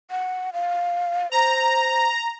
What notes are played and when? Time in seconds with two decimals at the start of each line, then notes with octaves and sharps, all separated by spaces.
0.11 F#5
0.53 F5
1.32 C5 A#5